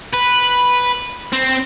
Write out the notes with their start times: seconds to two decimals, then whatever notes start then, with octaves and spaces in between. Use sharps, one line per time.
0.14 B4
1.33 C4